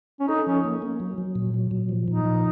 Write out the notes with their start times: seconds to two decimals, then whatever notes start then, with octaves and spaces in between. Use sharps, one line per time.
0.20 C#4
0.28 D#4 A4
0.47 F3 C#4
0.64 A#3
0.82 A#3
1.00 F#3
1.18 F#3
1.36 A#2
1.54 F#3
1.71 A#2
1.89 F3
2.08 A#2 D#4
2.25 F3